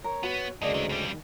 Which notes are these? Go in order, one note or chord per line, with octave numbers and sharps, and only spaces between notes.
A#4 C#5
B3 F#4
D2 G2 C#3 G#3 A#3 D5 D#5
D#3 E3
F2 G3 C#4
D#3